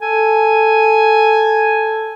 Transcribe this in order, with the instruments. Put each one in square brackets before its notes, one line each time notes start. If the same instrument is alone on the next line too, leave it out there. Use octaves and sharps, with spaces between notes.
[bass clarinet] A4 [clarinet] G#5